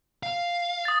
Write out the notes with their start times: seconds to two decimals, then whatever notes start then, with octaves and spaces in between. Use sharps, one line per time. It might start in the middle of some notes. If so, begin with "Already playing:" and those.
0.23 F5
0.85 D#6 A6